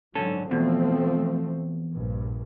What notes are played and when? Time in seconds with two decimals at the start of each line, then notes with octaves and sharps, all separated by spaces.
0.15 G#2 D3 F#3 C#4 A4
0.51 E2 B2 F3 A3 C4
1.93 A#1 G2